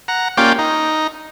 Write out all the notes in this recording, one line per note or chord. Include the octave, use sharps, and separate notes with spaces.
F#5 A#5
A#3 C#4 F4 G4 D5 G5
D#4